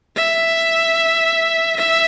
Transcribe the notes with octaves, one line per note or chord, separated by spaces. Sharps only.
E5
E5